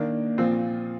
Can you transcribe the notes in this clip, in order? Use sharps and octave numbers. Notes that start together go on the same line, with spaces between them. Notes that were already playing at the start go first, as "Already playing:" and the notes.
Already playing: D#3 A#3 D4
A#2 F3 C4